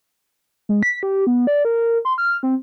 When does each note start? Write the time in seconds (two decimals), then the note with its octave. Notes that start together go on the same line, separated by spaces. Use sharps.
0.69 G#3
0.83 B6
1.03 G4
1.27 B3
1.47 D5
1.65 A#4
2.05 C6
2.18 F6
2.43 C4